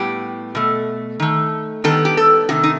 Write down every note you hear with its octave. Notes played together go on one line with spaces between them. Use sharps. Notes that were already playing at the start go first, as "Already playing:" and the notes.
Already playing: A2 G3 B3 G4
B2 A3
D#3 A3
D#3 G3 B3 A4
G4
A4
C3 D#3 A3 F#4
D#4